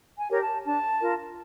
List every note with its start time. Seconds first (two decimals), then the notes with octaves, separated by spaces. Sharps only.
0.16 G#5
0.28 G4 A#4 C#5
0.41 A5
0.64 D4 A5
1.00 F4 A#4